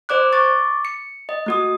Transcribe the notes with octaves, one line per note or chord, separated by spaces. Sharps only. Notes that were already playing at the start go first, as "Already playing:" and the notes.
C5 D5 D6 F#6
C#6 D6 A6
C#7
D#5
A3 F#4 D#6